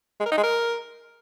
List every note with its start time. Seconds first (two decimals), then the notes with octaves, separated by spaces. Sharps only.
0.20 G#3
0.26 A#4
0.32 D#4
0.37 G#3
0.43 A#4